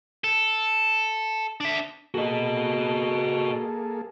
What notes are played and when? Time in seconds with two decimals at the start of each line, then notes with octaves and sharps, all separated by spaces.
0.24 A4
1.61 D4 E5
2.14 A#3 F#4 G#4 A4 D#5